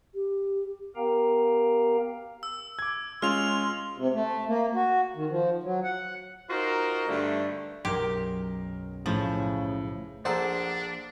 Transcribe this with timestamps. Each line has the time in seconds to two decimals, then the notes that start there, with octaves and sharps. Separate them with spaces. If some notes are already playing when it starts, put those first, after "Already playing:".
0.15 G4
0.96 B3 G4 A#4 F5 G5 A#5
2.43 E6
2.79 D6 G#6
3.22 G#3 C#4 F4 C6 F6 F7
3.97 C3
4.14 A3
4.48 A#3
4.74 F#4
5.16 D#3
5.30 F3
5.63 F#3
5.84 F#5
6.50 D#4 F4 F#4 A#4 C5
7.08 G2 D3 A3
7.85 B1 F#2 G4 G#4 A#4 C6
9.06 A2 C#3 F3 E5
10.25 A#1 D4 G#4 A4 C5 F#5 A#5